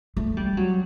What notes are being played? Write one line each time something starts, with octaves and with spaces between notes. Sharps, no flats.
A3
G3
F#3